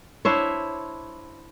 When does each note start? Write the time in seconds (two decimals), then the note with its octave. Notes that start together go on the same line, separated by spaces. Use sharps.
0.25 D4 E4 C5 C#5